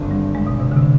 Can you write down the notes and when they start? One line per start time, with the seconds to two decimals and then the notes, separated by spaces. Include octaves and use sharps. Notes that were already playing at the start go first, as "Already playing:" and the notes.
Already playing: G#1 G2 D3
0.11 G3
0.35 G#3
0.47 B2
0.60 C3
0.71 D3
0.77 C3
0.83 D3